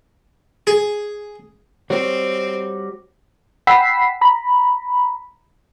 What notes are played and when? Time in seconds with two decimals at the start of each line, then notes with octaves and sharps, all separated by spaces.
0.67 G#4
1.90 G3 C4 F#4 C#5
3.67 F#5 G5 B5 E6 B6 C7
4.21 A#5 B5